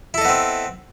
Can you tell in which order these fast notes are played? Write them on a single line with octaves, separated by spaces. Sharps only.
E4 A4 D#5 B3 C4